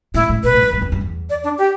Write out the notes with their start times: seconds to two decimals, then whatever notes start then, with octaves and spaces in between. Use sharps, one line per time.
0.14 A2 E4
0.29 A2
0.44 B2 B4
0.54 A2
0.63 E2
0.73 G2
0.82 E2
0.92 G2
1.01 E2
1.30 D5
1.44 D4
1.58 G4